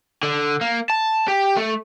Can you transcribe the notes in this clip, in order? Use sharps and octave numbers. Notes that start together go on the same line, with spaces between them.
D3
A#3
A5
G4
A3